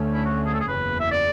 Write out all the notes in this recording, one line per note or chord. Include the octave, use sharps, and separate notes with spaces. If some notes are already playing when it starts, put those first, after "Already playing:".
Already playing: D2 D3 A3 C#4
E4
F#4
G#4
A4
G#4
F#1 E2 C#3 B4
E5
D5